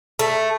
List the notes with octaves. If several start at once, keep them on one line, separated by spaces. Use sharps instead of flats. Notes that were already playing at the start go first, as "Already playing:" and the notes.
A3